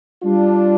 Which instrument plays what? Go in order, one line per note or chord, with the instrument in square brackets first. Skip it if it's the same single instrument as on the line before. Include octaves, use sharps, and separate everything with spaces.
[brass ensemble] G3 D4 F4